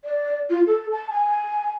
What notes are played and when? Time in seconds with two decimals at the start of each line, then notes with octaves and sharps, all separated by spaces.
0.05 D5
0.50 F4
0.67 A4
0.92 A5
1.11 G#5